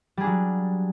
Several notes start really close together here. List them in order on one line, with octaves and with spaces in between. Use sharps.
G3 G#4 D4 F#3